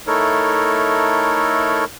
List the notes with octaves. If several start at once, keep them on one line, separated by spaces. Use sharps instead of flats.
A3 D#4 E4 A4 A#4 C#5